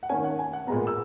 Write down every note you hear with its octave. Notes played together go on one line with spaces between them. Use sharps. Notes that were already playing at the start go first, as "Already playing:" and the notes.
F#5
D#3 A#3 C#4 G#5
F#5
G#5
F#5
A#2 G#3 B3 A#5
E6